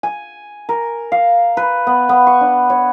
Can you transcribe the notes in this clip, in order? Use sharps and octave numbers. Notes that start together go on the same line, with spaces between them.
G#5
A#4
F5
B4
B3
B3
C#6
D4
C#5